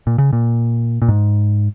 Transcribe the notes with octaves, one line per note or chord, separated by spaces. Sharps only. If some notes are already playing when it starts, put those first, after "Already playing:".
A#2
C#3
A#2
A#2
G#2